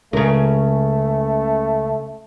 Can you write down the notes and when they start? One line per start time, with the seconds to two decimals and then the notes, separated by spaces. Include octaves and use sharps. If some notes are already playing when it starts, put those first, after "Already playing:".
0.13 C#2 C#3 A3 A#4